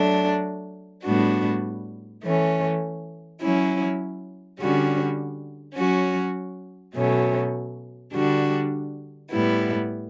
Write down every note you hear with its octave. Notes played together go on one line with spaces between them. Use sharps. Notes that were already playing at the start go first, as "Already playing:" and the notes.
Already playing: F#3 A3 D4
A2 G3 B3 D4 F#4
E3 A3 C#4
F#3 C#4 E4
D3 G3 C#4 F#4
F#3 C#4 F#4
B2 F#3 A3 C#4
D3 G3 D4 F#4
A2 G3 B3 E4